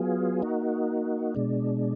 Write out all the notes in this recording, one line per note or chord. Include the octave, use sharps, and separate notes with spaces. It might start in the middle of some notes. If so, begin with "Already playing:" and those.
Already playing: F#3 B3 F4 G#4
A#3 D#4 F#4
B2 G#3 D4